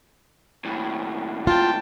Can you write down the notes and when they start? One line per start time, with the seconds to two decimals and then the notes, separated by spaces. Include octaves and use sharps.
0.65 D#2 A2
1.47 F4 G5 A5